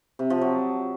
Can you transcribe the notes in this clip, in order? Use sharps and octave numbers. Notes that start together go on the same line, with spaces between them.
C3
F3
F#3